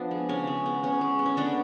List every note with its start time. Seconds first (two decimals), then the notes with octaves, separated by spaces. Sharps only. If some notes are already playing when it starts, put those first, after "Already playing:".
Already playing: F3 B3 D4
0.11 G#3
0.29 C#3 C#4
0.47 G#3
0.66 B3
0.83 B3 C#4
1.01 G#3
1.19 B3
1.26 C#4
1.37 D3 B3 D4